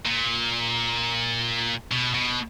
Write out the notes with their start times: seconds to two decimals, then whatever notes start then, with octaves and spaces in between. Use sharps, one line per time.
0.05 A#2
1.91 B2
2.14 B2